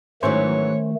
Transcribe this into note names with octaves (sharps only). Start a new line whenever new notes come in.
G#2 D#3 E3 F#3 A3 C#4 C5 C#5